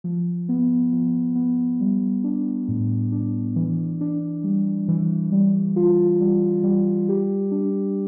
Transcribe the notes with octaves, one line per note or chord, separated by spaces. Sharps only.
F3
B3
F3
B3
G3
D4
A2
D4
E3
D4
G3
E3
G3
F4
G3
G3
G4
D4